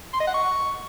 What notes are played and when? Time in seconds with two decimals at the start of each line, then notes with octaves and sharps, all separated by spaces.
0.13 C6
0.20 D#5
0.27 F#5
0.34 C#6